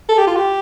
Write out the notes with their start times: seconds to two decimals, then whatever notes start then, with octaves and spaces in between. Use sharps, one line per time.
0.09 A4
0.18 G4
0.27 F4
0.36 G4